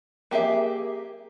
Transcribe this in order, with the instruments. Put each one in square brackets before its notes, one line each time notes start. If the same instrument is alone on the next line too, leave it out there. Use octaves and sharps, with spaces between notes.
[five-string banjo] A#3 G4 G#4 E5